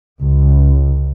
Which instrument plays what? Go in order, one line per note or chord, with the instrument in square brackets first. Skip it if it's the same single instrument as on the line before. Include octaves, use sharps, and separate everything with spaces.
[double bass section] C#2